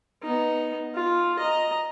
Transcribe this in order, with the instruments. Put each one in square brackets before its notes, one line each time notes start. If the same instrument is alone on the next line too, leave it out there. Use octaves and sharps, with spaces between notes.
[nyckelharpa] B3 D#4
F4
D#5 A#5